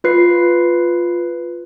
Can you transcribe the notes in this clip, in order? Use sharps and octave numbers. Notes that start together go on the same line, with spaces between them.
F4 B4 C7